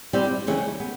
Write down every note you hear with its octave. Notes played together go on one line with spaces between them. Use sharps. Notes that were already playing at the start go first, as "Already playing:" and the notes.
G3 C4 E4 G4
D#2 C#3 E3
B3